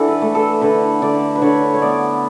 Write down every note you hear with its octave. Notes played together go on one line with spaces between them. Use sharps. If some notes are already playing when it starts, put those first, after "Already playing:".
Already playing: E3 D4 E4 F#4 A4 D5
B4
A3
A4
D3 B4
D3 D5
B4
D3 C#5
C#5
B3 D5